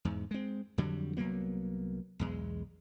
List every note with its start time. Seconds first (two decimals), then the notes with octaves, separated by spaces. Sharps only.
0.05 E2 G#2
0.31 G#3 C4
0.78 F2 D3 F#3 G3
1.17 C2 F#3 A#3 B3
2.19 B1 E2 G#3